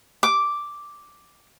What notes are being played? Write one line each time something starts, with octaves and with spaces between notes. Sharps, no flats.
D6